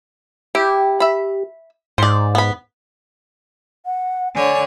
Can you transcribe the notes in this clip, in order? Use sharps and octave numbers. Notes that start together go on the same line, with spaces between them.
E4 G4
E5 B5
G#2 C5 D5
B3 B5
F#5
D3 C#5 G#5